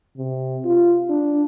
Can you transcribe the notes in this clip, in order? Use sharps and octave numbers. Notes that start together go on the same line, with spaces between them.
C3
F4
D4